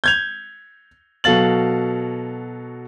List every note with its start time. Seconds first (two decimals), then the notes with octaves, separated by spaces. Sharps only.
0.04 G6 G#6 F7
1.24 B2 F#3 A4 F5 A6 F#7